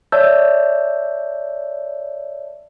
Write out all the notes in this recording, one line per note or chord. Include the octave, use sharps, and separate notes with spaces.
C#5 D5 E5 A5 E6 G6